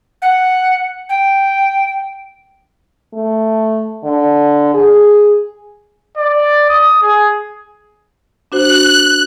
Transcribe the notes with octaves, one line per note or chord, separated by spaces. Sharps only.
F#5
G5
A3
D3
G#4
D5
D#6
G#4
D4 F#4 C5 F#6